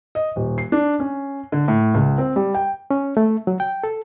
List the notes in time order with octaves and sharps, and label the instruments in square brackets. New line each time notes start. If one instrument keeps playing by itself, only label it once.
[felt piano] D#5
D#1
C7
D4
C#4
D3
A2
C#2
C4
G3
G5
[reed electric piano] C#4
A3
F#3
G5
A4